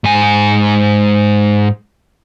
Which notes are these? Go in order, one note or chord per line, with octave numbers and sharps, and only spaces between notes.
G#2 G#5